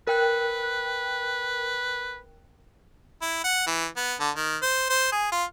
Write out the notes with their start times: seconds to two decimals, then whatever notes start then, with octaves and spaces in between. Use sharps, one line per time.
0.07 A#4 B4 G5 F#6
3.22 E4
3.44 F#5
3.67 E3
3.97 B3
4.20 D3
4.36 D#3
4.63 C5
4.90 C5
5.12 G#4
5.32 F4